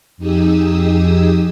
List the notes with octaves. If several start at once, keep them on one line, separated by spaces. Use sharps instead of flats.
F2 D#4 G4 G#4 D#6 E6